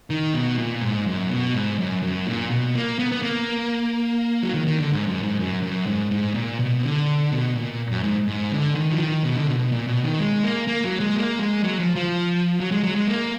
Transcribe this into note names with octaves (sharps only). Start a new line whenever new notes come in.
D#3
B2
A#2
G#2
F#2
B2
G#2
F#2
F#2
A#2
B2
A#3
B3
B3
A#3
F#3
D#3
D#3
D3
G#2
F#2
G#2
F#2
F#2
G#2
G#2
A#2
B2
D3
B2
A#2
F#2
G#2
G#2
D3
D#3
F3
D#3
B2
D3
B2
B2
A#2
B2
D#3
G#3
A#3
A#3
F#3
G#3
A#3
G#3
F#3
F3
F3
F#3
G#3
F#3
G#3
A#3